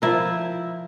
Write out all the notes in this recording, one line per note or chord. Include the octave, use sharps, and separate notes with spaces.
F3 E4 A#4